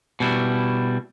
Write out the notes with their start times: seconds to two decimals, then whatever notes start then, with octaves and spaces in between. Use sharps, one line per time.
0.20 B2 G3 E4